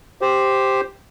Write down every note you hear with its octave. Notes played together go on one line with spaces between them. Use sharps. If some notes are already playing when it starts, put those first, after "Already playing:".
G4 C5